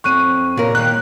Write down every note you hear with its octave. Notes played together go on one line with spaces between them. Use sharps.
F2 C4 C#6 F#6 D#7
A#2 C#3 A#4
D#3 G3 A#3 F#6